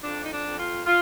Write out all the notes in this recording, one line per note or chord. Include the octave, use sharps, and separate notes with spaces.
F2 D4
D#4
D4
F2
F4
F4